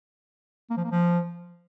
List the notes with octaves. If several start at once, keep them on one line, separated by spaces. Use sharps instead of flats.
A#3
F3
A#3
F3